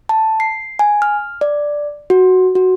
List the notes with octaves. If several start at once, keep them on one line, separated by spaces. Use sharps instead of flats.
A5
C7
G#5
F6
D5
F#4
F#4